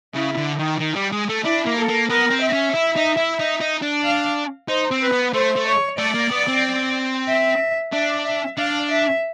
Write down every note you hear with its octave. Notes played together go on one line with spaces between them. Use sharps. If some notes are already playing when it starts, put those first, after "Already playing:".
C#3 E4
D3
D#3
D#3
G3
G#3
A3
D4 E4
A#3
A4
A#3
B3 A#4
C4
E5
C#4
E4
D#4
E4
D#4
D#4
D4
F5
D#4 C5
C4
B4
B3
A3 C5
A3
C#5
A3 D5
A#3
B3
C4
E5
D4 E5
E5
D4 F5
E5